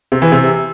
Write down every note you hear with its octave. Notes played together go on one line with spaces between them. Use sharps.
C3
E3
C3